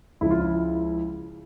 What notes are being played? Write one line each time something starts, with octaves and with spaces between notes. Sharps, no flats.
C#2 C#3 F3 E4
F4
E4